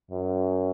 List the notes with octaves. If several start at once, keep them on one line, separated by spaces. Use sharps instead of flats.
F#2